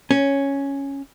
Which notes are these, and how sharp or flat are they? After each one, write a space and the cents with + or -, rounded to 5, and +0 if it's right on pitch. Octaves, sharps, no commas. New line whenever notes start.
C#4 +0